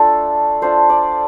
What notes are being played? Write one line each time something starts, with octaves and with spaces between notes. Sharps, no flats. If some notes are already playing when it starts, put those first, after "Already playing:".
Already playing: A3 D4 F4 A4
A3 D4 F4 C5
D5